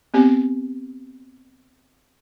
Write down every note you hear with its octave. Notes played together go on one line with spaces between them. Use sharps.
B3 C4 G4